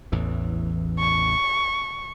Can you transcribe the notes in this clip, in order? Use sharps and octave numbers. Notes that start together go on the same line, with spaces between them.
A1 E2 E3
C#6